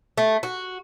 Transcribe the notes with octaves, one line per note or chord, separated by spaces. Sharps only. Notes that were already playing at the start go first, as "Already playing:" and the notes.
A3
F#4